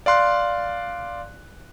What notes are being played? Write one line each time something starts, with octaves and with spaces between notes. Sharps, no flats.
D5 F5 C6 F#6